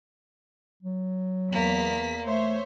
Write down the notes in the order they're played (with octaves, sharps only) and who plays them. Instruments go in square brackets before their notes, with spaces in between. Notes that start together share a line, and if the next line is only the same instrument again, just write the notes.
[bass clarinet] F#3
[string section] E2 B6 [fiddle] A#3
[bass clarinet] A3 [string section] C5 C#5 E5